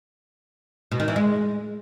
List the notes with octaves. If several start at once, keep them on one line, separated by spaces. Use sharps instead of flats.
B2
D#3
E3
G#3